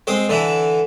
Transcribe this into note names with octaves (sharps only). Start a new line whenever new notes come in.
G#3 C4 D#5
D3 E3 E4